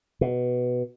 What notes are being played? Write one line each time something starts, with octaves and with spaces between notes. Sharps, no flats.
B2